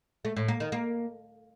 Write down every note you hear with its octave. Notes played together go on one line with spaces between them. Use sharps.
A3
A2
A#3
D#3
A#3